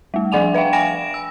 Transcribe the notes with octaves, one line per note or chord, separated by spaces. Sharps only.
G3 A3
F3 D4 F#5 G#5 F7
B4 E5 F5 G5
G5 G#5 B5 A#6 D7 E7
E6